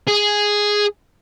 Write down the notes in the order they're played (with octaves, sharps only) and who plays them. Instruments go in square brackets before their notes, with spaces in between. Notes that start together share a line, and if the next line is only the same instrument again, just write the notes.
[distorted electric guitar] G#4